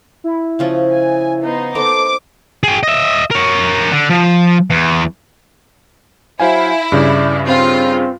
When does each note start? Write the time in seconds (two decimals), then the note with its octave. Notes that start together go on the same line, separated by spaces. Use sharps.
0.24 E4
0.59 C#3 F3 C#4
0.91 G#5
1.40 B3 D#4 C5
1.75 D#4 A4 C5 A#5 D6
2.63 G#4 G5
2.83 D#5 E5
3.31 A#4 C#5
3.91 D3
4.09 F3
4.70 E2
6.40 F#3 E4 C5 F5 G#5
6.92 G2 C#3 D5
7.46 C4 F4